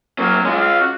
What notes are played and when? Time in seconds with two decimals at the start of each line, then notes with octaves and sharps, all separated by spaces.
0.19 F#3 A#3 C#4
0.45 G#3 C#4 F4
0.61 F5
0.81 F#4